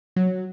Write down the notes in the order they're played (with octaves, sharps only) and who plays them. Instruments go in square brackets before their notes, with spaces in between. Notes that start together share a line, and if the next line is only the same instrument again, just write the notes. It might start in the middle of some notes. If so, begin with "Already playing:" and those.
[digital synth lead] F#3